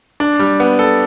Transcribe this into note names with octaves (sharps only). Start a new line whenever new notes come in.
D4
G3
B3
A4